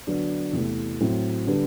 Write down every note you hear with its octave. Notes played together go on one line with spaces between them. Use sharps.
D3 F#3 B3 D4
E2 C3 E3 A3
A2 F#3 C4
D3 G3 B3 D4